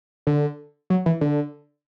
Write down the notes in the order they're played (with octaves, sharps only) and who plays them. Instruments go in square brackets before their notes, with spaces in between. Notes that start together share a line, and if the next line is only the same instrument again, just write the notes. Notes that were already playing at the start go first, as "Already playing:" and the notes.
[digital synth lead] D3
F#3
E3
D3